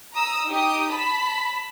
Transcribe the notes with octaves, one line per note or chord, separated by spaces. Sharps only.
A#5 D#6 E6
D#4 G4 D#6
A5 B5 B6